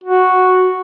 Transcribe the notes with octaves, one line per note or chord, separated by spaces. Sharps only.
F#4